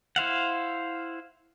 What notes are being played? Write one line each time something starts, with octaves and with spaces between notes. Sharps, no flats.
E4 C5 F5 F#5